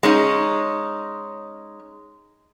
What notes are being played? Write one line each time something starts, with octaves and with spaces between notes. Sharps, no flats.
G#3 C#4 D#4